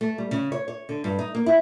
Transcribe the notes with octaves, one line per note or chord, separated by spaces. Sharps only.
A3
G3
C#3
C#5
C#5
D3
G2
D#4
A#3
E4